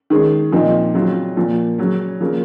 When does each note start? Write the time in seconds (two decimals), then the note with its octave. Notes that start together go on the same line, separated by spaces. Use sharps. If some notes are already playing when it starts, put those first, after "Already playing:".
0.10 D#3 G#3 C#4
0.52 A#2 F3 C4 D#4
0.94 C#3 F#3 C4 F4
1.36 A#2 F3 A#3
1.79 C#3 F#3 C#4
2.21 C#3 F3 A#3